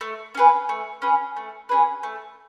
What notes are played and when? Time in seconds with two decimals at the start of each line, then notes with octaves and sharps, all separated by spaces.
0.01 A3
0.35 C#4 G#4 B4
0.69 A3
1.02 C#4 G#4 B4
1.37 A3
1.69 C#4 G#4 B4
2.03 A3